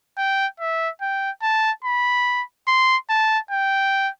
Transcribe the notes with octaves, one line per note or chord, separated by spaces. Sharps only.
G5
E5
G5
A5
B5
C6
A5
G5